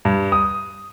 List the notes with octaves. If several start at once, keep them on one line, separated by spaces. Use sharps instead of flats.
G2
D#6